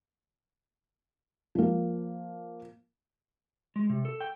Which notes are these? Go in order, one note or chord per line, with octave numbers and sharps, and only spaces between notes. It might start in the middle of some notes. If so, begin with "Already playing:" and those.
F3 A#3
G#3
C3
A4
G5